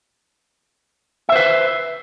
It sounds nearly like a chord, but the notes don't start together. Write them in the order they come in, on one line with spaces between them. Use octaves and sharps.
E5 C5 B4